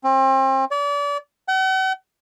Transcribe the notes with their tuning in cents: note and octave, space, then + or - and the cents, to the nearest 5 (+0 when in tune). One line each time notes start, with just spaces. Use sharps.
C4 +35
D5 -35
F#5 +45